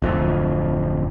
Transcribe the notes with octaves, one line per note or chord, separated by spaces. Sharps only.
D1 F2